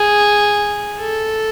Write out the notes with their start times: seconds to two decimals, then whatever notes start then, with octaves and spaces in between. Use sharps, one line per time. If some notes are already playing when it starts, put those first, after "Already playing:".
Already playing: G#4
0.99 A4